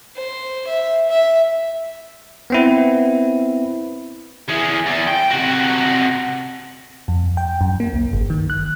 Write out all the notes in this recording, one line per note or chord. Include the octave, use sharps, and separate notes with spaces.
C5
E5
E5
B3 C4 E4
E3 G#4
E2
G5
C3 F#4
F2
G5
F#2
A#3
C2
G1
D#3
F#6